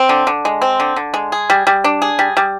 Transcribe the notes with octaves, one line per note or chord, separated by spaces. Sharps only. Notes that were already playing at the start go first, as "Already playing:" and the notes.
Already playing: C4
D3
D3
G#3
C4
D3
D3
G#3
G#4
G3
G3
D4
G#4
G3
G3